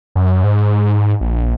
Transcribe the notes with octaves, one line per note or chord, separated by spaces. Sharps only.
F#2
G#2
A#1